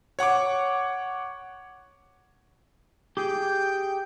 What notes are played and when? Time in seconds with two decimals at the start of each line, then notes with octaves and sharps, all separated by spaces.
0.19 C#5 F#5 C#6 D6
3.17 G4 G#4 G5